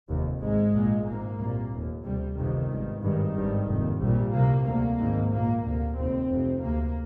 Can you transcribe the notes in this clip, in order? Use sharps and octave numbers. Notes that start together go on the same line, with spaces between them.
F1 D#2
G#1 G#2 G#3
A#1 A#2
G#1 G#2 A#3
C2 A#2
F1 D#2
D2 C3 G3
G1 F2 C3 D#3
G#1 G2
G#1 G2 D#3
G#1 G2
F1 D#2
A#1 A#2 G3
C2 C3 A#3
D2 C3 A#3
G#1 G#2
A#1 A#2 A#3
D2 C3 A#3
F1 D#2 C4
F1 F2 C3
D2 C3 A#3